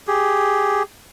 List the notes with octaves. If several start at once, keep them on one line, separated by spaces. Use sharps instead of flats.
G4 G#4